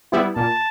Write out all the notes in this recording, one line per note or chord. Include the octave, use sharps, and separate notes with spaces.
G3 B3 E4
A#2 A5